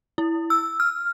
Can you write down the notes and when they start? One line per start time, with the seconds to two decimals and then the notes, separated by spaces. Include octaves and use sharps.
0.18 E4
0.50 E6
0.80 F6